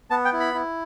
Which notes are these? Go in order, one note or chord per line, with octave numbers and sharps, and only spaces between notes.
B3 A5
G5
E4
B5
E4